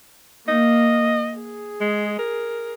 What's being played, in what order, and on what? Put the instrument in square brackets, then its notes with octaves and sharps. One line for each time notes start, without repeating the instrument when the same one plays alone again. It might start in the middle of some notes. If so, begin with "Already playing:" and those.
[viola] A#3 [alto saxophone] D#5
[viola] G#4
[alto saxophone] G#3
A#4